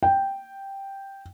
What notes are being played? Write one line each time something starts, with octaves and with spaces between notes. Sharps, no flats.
G5